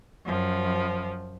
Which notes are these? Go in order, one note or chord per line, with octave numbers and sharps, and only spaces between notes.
F#2 F3